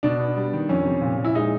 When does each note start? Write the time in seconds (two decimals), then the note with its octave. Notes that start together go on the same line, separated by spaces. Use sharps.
0.03 B2 D4
0.20 B3
0.36 G3
0.53 D#3
0.69 F2 C#4
0.85 C3
1.01 A#2
1.18 A#2
1.25 E4
1.35 G#3 D#4